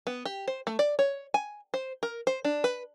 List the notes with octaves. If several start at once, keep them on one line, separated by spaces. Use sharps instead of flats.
B3
G4
C5
A3
D5
C#5
G#5
C5
A#4
C5
D4
B4